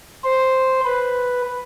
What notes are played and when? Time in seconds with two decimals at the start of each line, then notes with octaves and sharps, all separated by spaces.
0.24 C5
0.85 B4